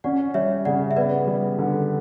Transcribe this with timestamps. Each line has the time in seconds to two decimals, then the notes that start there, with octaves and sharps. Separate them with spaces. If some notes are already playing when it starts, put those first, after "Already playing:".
0.04 C#4 D5 F#5
0.34 G3 C#5 E5
0.65 C#3 D5 F#5
0.91 E5
0.96 B3 B4 D5
1.27 G3
1.59 D3